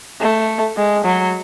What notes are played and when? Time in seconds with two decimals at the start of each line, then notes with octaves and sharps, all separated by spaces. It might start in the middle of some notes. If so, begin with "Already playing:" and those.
0.21 A3
0.77 G#3
1.04 F#3